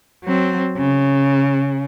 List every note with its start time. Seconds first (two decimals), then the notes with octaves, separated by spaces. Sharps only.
0.24 F#3 C4
0.77 C#3